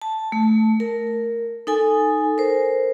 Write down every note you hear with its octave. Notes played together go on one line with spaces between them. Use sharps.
A5
A3
A#4
D#4 A4 G#5
A#4 C5